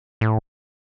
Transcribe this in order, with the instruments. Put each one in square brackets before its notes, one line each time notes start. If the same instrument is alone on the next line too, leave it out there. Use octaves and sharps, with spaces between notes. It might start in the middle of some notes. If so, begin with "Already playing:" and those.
[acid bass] A2